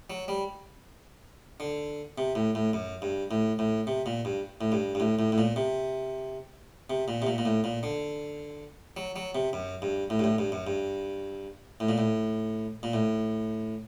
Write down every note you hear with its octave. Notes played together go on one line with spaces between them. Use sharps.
F#3
G3
D3
C3
A2
A2
F#2
G2
A2
A2
C3
A#2
G2
A2
G2
G2
A2
A2
A2
A#2
C3
C3
A#2
C3
A#2
A#2
A2
A#2
D3
F#3
F#3
C3
F#2
G2
A2
G2
A2
G2
F#2
G2
A2
A#2
A2
A#2
A2